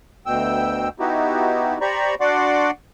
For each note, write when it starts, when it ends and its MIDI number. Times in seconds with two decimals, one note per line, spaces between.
0.26 0.89 38
0.26 0.89 47
0.26 0.89 79
0.26 0.89 88
0.99 1.78 59
0.99 1.78 63
0.99 1.78 64
0.99 1.78 66
0.99 1.78 67
1.81 2.15 67
1.81 2.15 72
1.81 2.15 74
1.81 2.15 82
1.81 2.15 83
1.81 2.15 85
2.20 2.71 62
2.20 2.71 66
2.20 2.71 74
2.20 2.71 78
2.20 2.71 84
2.20 2.71 86